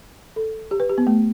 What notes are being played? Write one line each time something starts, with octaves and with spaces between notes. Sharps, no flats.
A4
G4
B4
G4
B3
A3